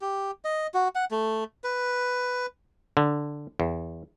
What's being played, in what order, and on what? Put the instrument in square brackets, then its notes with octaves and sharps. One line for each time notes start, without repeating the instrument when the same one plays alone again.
[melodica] G4
D#5
F#4
F#5
A3
B4
[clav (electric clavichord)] D3
E2